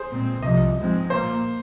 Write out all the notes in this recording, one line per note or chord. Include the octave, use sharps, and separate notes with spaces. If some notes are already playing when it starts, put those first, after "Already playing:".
Already playing: G#4 C5
A#2 G#3 C4
C2 C3 F3 D#5
G#2 F3 G#3 C4
A#2 A#3 C5